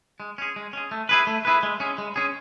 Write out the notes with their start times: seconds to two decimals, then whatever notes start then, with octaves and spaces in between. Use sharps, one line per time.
0.20 G#3
0.38 C#4 G#4
0.56 G#3
0.73 C#4 G#4
0.91 A3
1.09 E4 G#4 B4
1.27 A3
1.45 E4 G#4 B4
1.63 G#3
1.80 C#4 G#4
1.98 G#3
2.16 C#4 G#4